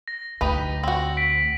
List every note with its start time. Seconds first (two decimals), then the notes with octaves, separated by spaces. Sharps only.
0.08 A#6
0.41 D2 D#4 G4 B4
0.83 C4 F#4 F#7
1.17 B6 D7